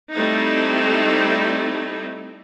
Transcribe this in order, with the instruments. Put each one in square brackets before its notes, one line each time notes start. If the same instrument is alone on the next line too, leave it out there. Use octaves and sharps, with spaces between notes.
[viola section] G3 A3 C4 D#4 E4